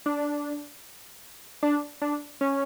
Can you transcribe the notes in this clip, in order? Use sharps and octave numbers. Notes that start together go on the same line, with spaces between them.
D4
D4
D4
C#4